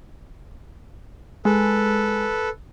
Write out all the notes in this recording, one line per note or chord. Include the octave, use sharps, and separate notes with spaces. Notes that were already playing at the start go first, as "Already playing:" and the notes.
G#3 A4 B4